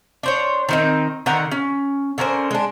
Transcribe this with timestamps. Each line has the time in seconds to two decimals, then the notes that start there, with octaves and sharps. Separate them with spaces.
0.23 D4 C5 C#5
0.69 D#3 C4 D#4
1.26 D3 D#3 F#5 A#5
1.51 C#4
2.18 D3 C#4 A#4 C5
2.51 G#3 D4